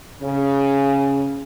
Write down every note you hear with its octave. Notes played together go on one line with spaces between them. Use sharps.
C#3